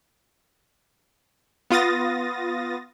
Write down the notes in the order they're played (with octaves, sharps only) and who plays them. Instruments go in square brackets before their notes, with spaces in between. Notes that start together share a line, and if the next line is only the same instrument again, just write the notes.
[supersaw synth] B3 F4 D#6 A6 A#6